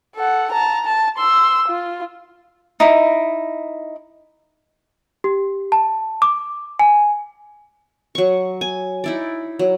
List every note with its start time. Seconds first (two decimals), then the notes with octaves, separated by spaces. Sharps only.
0.16 A4 F#5
0.52 A5 A#5
0.85 A5
1.18 C6 E6
1.68 F4
2.80 D#4 E4
5.24 G4
5.72 A5
6.22 D6
6.79 G#5
8.15 F#3 C#6
8.61 G#5
9.04 D#4 E4 D5
9.59 F#3